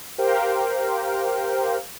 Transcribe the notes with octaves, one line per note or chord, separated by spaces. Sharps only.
G4 A#4 C5 F5 G5